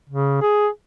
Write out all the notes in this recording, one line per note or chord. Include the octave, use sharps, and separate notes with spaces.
C#3
G#4